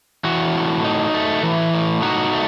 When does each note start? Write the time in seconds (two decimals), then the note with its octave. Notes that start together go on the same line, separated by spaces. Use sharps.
0.24 E3 F#4
0.54 A2
0.84 D#4
1.14 A3
1.43 E3
1.73 A2
2.02 D#4 F#4
2.33 A3